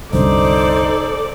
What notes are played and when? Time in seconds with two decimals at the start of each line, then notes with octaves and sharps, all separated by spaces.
0.13 C2 F#2 D3 D#4 A4 C5 D5